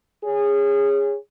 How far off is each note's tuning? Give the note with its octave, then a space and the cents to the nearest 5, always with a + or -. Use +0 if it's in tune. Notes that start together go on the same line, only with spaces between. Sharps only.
G#4 -20 C#5 +0